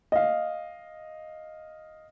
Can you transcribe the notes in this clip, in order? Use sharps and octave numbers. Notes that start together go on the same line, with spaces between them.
D#5 F5